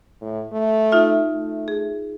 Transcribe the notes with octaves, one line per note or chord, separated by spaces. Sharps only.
A2
A3
D#4 F4 E5
A3
G#4